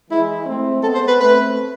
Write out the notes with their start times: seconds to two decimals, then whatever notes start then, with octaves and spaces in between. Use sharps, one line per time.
0.10 E3 G#3 E4
0.46 A3 C4
0.83 G#3 B3 A4
0.95 C5
1.08 B4
1.19 A3 C4 B4